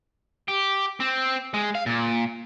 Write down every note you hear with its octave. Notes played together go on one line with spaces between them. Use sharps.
G4
C4
G#3
F5
A#2